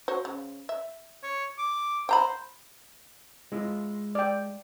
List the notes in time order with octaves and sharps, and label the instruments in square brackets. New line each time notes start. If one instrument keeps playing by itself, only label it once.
[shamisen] F#4 C5 C#5
C#3
E5
[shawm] C#5
D6
[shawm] C5 [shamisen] G5 A#5 B5
[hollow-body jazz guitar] G#3 E4 F4
[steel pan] D5 G5